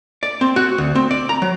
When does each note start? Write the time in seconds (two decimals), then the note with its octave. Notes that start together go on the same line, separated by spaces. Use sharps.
0.23 D5
0.41 C4
0.56 F#4
0.78 D2
0.95 C4
1.11 D5
1.29 A#5
1.42 F#3